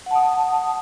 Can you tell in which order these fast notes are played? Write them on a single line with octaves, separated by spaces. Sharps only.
F#5 A5 D#6